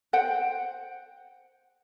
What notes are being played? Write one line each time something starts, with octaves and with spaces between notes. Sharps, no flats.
C5 F#5 G5